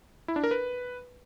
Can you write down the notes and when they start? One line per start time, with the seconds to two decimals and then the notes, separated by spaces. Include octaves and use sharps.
0.28 E4
0.36 D4
0.44 A#4
0.51 B4